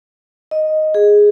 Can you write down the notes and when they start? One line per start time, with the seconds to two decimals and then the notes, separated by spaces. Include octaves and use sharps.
0.51 D#5
0.94 G#4